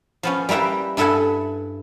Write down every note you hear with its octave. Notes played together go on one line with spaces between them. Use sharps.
F3 B3 C#4
G3 A#3 E4 B4 G5
G2 E4 A4 B4 F#5 G#5